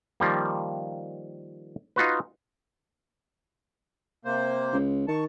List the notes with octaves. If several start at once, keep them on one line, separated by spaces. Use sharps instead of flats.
D#3 F3 G3 A#3
D#4 F4 F#4 B4
C3 A#3 C5
C#2
D#3 A5 C#6